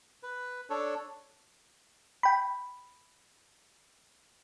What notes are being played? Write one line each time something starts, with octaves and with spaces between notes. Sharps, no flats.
B4
D4 A4 C#5
G5 B5